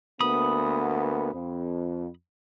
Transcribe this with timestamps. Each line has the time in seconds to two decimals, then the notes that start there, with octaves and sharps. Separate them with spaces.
0.20 D2 A#3 B3 B5 D#6
1.33 F2